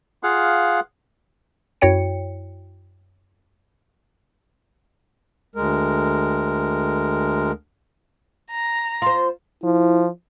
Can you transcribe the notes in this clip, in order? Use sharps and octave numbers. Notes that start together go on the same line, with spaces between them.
F4 G#4 F5 F#5
F#2 E4 F#4 C#5 G5 C#7
D2 G#3 A#4
A#5
F4 C5 C6
F3 E4